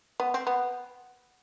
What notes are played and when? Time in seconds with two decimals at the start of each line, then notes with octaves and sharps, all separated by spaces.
0.20 B3
0.34 C4
0.47 B3